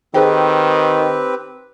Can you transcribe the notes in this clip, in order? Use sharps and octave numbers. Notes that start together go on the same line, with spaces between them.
D#3 C4 G4 G#4 B4 C5 G5